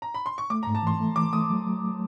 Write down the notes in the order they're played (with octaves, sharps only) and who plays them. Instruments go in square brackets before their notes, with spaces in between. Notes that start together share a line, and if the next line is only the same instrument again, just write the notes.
[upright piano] A#5
B5
C6
C#6
[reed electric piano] A3 [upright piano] D6
[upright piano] A#5
[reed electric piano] G#2
[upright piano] A5
[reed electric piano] E3 [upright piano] C6
[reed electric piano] A3
[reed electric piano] E3 [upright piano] D6
[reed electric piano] A3 [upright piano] D#6
[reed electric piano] F#3
F#3